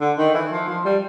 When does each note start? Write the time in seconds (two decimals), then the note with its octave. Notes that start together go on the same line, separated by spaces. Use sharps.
0.01 D3
0.18 D#3
0.34 E3
0.52 F3
0.69 F3
0.85 G3